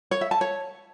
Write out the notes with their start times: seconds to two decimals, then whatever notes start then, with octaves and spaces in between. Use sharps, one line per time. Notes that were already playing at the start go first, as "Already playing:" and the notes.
0.11 C#5
0.21 E5
0.31 A5
0.41 C#5